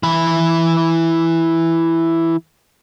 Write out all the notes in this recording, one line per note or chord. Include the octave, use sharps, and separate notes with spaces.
E3 B5